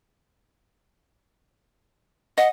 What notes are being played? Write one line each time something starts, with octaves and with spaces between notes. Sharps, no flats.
D#5 F#5